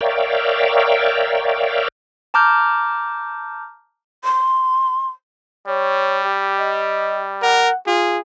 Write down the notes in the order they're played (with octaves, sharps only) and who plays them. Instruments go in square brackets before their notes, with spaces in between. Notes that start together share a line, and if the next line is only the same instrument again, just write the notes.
[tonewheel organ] A#4 C#5 D5 E5 F5 G5
[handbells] A5 A#5 D6 F6 G6
[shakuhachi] C6
[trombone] G3 [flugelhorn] C#5
[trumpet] G4
[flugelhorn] D#5
[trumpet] A#4 [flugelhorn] F#5
[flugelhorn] F4 [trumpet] G#4